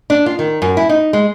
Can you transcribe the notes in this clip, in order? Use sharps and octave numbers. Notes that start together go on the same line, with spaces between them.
D4
F4
D#3
F#2
E4
D#4
G#3